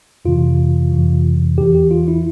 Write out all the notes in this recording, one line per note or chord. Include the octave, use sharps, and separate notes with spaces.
F2 C3 E3 F4
F2 C3 E3
E2 E3 G4
G4
F4
E4